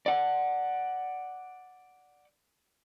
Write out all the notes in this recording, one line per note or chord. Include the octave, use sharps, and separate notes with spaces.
D5 F#5